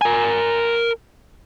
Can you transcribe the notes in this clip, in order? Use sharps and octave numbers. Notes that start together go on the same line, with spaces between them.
A#4 G#5